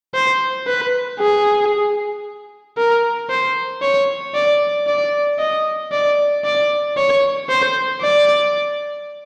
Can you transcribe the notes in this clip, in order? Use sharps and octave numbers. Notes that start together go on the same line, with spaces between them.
C5
B4
G#4
A#4
C5
C#5
D5
D5
D#5
D5
D5
C#5
C5
D5